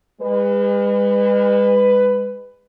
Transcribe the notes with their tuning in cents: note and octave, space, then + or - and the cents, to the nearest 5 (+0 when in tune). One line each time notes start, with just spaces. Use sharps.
G#3 -40 B4 +15